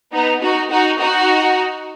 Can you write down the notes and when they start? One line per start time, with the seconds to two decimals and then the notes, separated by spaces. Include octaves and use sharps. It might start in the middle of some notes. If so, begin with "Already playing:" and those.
0.13 B3 D#4
0.42 D#4 F#4
0.70 D#4 F#4
1.00 D#4 F#4